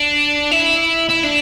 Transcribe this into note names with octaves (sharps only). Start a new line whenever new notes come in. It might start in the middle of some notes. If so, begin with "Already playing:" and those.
Already playing: D4
E4
E4
D4